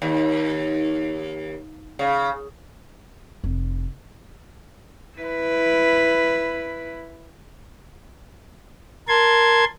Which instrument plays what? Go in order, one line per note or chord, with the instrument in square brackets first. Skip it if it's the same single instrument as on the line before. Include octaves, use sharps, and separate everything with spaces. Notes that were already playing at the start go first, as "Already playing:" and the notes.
[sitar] D#2
C#3
[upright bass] F1
[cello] E4 B4
[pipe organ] A#4 A5 C6 G#6